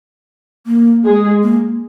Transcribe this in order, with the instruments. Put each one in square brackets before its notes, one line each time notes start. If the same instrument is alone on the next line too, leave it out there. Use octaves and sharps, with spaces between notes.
[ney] A#3
[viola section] G#3 G#4
[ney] A#3